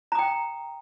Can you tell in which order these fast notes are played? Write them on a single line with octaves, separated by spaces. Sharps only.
A#5 D#6 G5